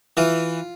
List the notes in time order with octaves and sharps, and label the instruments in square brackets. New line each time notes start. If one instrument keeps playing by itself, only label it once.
[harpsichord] E3 F4